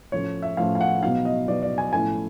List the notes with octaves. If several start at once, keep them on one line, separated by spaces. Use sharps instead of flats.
A2 F3 A3 C#4 C#5
E5
A2 F3 A3 C#4 F5
F5
F#5
B2 F#3 B3 D#4 F5
D#5
B2 F#3 B3 D#4 D5
D5
G#5
A2 F3 A3 C#4 E4 G#5